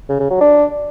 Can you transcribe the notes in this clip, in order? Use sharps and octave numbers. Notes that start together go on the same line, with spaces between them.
C#3
C#3
F#3
D4